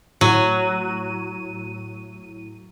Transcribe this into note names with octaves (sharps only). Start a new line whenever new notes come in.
A2 F#3 D#7